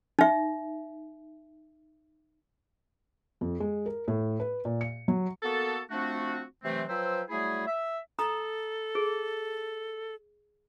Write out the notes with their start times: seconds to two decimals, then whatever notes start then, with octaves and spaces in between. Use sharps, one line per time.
0.19 D#4 E5
3.41 F2
3.60 G#3
3.86 A#4
4.08 A2
4.40 B4
4.65 A#2
4.81 C#7
5.08 F#3
5.42 A#3 B3 F#4 A4
5.91 F3 A3 C4 D4 F#4
6.63 C3 E3 F#3 A3 C4
6.88 F3 F#3 B4 C5 G5 E6
7.29 F#3 G3 A3 E4 G#4
7.67 E5
8.19 A4 A#5 D#6
8.95 G#4